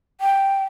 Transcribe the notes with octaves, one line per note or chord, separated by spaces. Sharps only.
G5